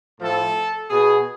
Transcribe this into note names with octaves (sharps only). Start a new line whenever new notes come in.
A2 F3 A4
B2 G#4